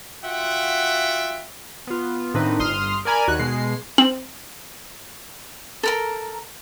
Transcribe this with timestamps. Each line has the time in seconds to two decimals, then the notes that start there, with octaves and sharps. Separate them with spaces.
0.23 F4 F#4 E5 F#5 G5
1.87 B3 F4
2.34 A2 D#3 C4 D4 D#4 B4
2.59 G1 C6 D#6 F6
3.05 A#4 D5 G#5 A#5 B5
3.27 D#2 F#4 F#6
3.39 B2 G#3 C7
3.98 C4 F#7
5.83 A4 A#4 A#5